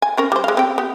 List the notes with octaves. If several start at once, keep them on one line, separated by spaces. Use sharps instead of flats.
G#5
C4 C#4 A#4
G3 C5
G#3 F5
C4 G4 G5
B3 G4